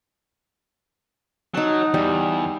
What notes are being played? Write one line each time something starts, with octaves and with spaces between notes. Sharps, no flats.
F#3 D#4 A5
E2 G3